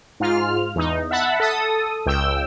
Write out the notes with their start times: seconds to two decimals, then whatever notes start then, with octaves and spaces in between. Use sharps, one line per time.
0.20 G#2 F4 F6
0.76 E2 D#4
1.11 E5 F#5 A5 B5
1.40 A4 D#6
2.06 C#2 G5 E6